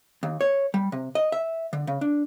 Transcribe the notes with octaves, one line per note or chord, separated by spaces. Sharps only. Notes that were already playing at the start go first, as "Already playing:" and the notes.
D#2
C#5
G3
C3
D#5
E5
D3
C#3
D4